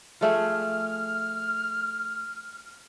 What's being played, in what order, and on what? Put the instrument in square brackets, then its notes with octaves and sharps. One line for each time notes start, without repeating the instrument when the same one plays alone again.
[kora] F3 A3 G#4 [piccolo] F6